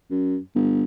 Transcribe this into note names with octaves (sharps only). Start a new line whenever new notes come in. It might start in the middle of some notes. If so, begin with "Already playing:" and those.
F#2
G1